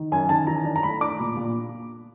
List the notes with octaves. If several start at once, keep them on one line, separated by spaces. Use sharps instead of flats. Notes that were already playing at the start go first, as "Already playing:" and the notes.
Already playing: D#3
F#2 G#5
D#3 A5
E3 A#5
D4
A#5
A3 B5
D4 D6
A#2
A#2